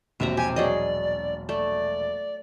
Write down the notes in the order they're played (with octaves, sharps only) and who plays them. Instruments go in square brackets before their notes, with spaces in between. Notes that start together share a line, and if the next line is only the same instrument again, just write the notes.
[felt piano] E1 A#1 F#4 [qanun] C3 E5 A#5
[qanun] G4 [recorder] G#5
[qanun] F#3 G#4 D#5 [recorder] D5
[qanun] A3 [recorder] D5